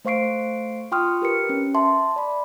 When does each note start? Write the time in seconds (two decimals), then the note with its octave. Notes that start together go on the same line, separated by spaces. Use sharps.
0.05 A3 C5 F5 C#6 C7 D7
0.92 F4 G5 C6 C#6 D#6 F6
1.22 G4 A#4 B4 C#7
1.49 C#4
1.74 E5 A5 C6
2.16 D5 B5